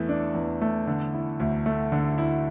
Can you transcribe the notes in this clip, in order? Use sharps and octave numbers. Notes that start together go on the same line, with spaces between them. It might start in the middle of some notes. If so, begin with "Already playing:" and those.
Already playing: E2 E3 A3
D4
E2
A3
D3
E4
D2
A3
D3
E4